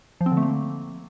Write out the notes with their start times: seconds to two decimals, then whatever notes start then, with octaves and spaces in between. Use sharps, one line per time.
0.21 F3
0.26 C4
0.32 D3
0.37 A3
0.43 A#3